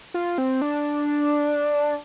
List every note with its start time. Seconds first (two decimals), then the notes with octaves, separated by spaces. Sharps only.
0.14 F4
0.38 C4
0.62 D4